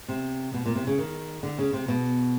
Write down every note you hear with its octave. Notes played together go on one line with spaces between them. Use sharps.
C3
B2
A#2
C3
C#3
D#3
D3
C#3
C3
B2